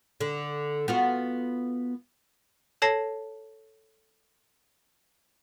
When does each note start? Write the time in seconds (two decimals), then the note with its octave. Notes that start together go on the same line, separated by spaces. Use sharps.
0.21 D3
0.88 B3 F4 F#4
2.82 A4 C#5 A5 A#6 C7